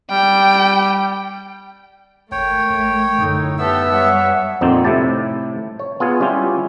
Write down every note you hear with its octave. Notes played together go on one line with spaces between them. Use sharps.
G3 G5
G#1 A3 A#4 C#5 G5
A1
F#2 A2 D3 D#4
B3 G4 A4 E5 E6
G3 C#5 E5 F#5
F2 A#2 C4 D#4 C5 D5
A2 C3 E4 G4 A5
C#5
B3 F4 G#4
G3 C#4 E4 F4 G4